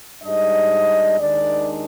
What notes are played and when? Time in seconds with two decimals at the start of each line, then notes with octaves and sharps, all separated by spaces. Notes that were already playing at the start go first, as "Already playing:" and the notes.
0.23 G#2 G3 D4 D#5
1.18 D#2 D#3 G#3 D4 D5